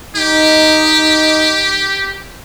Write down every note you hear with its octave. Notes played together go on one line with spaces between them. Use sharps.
D#4 G4